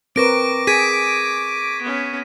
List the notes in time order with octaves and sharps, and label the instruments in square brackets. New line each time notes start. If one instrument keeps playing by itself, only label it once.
[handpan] C4 A#4 B4 [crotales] C#6 A#6 D7 [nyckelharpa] D6
[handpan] G#4 [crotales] G#6 B6 D#7
[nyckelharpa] B3 C#4